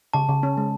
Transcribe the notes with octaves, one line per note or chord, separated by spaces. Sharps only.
C#3 A5
C#3
C#4
G#3